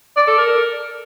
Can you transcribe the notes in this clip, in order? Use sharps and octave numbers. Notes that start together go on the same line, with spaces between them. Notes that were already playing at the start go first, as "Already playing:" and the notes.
D5
A4
A#4